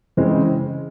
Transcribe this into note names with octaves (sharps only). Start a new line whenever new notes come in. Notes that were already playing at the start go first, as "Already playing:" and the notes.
C#3 E3 G#3 C4